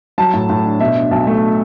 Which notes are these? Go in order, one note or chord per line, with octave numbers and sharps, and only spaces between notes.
F#3 A5
A2
A2
D4
B2 E5
D4
B1 A5
A3